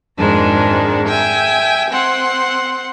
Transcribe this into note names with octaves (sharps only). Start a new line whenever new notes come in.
F2 G#2 D#3 G#3 D4
E5 G5 G#5
C4 F#5 C6